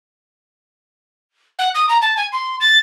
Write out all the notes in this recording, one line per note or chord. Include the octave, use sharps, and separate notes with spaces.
F#5
D#6
A#5
A5
G#5
C6
A6